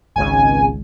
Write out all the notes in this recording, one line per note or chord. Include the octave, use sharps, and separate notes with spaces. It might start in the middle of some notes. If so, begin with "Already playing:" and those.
G#1 C#2 G#5